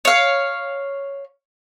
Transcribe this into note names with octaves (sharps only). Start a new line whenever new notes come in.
C#5 F5